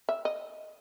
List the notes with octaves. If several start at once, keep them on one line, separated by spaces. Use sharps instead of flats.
E5
D#5